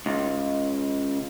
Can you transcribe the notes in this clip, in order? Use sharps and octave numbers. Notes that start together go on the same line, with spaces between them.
C#2